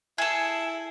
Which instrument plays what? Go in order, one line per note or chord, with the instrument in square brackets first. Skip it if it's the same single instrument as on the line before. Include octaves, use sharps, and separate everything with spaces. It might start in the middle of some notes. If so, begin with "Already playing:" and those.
[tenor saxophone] E4 [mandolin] G#4 A4